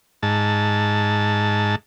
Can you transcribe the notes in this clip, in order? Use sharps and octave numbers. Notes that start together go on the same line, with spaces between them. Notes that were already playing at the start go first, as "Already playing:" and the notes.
G#2 A5